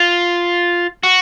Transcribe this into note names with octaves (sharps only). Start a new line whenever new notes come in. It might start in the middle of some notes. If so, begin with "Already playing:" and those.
Already playing: F4
F#4